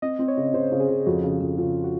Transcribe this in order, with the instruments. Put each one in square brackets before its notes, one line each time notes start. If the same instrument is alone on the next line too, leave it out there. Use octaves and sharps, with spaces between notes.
[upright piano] C4 [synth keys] D#5
[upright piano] C4
[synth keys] C#5
[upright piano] C#3
[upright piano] C#3 [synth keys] C5
[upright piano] C#3
[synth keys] G#4
[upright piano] C#3
[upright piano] F2 [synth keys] F#4
[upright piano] C#3
F2
[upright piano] C#3 [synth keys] F4
[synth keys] F#4